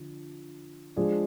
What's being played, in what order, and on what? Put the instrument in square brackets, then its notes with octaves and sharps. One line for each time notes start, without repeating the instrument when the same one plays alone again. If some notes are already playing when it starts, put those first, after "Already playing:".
Already playing: [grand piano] D3 F3 D4
F3 G#3 D4 G#4 D5